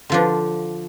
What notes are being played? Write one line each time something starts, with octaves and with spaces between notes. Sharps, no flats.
D3 F3 D4